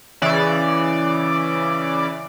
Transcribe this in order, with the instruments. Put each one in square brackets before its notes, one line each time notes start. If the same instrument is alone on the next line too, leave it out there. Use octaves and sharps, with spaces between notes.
[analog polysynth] C#3 E3 D5